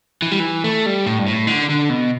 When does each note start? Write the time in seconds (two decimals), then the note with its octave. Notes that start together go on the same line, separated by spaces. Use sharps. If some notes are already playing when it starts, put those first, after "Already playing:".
0.22 E3
0.31 G3
0.39 E3
0.64 A3
0.86 G3
1.06 A2
1.19 G2
1.27 A2
1.47 D3
1.69 D3
1.89 B2